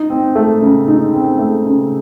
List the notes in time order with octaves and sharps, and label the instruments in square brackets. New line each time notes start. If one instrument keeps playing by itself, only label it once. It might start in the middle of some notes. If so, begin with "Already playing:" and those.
Already playing: [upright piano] D#4
C4
A3
C#3
D#4
C4
A3
C#3